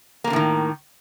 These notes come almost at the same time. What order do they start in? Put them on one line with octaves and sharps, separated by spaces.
A#3 G#3 D3 A2 D#3